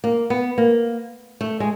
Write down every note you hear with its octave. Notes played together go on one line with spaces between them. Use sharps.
A#3
B3
A#3
A3
G#3